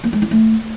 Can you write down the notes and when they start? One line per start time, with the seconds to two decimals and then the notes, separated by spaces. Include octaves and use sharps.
0.04 A#3
0.13 G#3
0.22 E4
0.31 A3